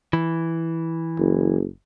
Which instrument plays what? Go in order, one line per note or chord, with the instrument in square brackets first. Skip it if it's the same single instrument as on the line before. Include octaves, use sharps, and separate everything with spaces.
[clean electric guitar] E3
[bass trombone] F#1